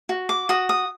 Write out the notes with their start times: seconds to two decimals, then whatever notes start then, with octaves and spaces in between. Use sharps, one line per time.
0.09 F#4
0.29 D6
0.49 F#4 D#6
0.69 D#6